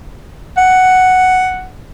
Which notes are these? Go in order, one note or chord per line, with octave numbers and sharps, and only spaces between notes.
F#5